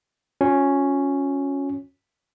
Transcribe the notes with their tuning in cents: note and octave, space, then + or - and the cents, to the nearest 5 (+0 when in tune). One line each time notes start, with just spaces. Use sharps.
C#4 +0 F4 +45